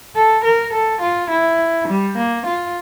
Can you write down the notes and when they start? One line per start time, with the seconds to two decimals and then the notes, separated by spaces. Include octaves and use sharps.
0.16 A4
0.45 A#4
0.73 A4
1.02 F4
1.31 E4
1.88 G3
2.17 A#3
2.47 F4